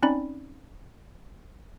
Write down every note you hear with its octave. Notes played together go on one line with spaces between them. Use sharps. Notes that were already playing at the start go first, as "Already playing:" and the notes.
C4 C#4 D#4 D5 B5